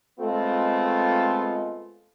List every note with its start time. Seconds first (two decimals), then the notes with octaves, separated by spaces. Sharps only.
0.19 G#3 A3 B3 C4 F4 A4